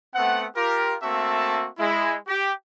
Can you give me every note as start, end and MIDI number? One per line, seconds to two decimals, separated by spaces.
0.15 0.47 57
0.15 0.47 59
0.15 0.47 60
0.15 0.47 78
0.56 0.96 65
0.56 0.96 67
0.56 0.96 70
1.03 1.68 57
1.03 1.68 58
1.03 1.68 60
1.03 1.68 66
1.03 1.68 76
1.03 1.68 81
1.79 2.17 56
1.79 2.17 64
2.28 2.52 67